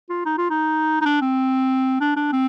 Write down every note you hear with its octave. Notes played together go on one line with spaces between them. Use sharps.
F4
D#4
F4
D#4
D#4
D4
C4
D4
D4
C4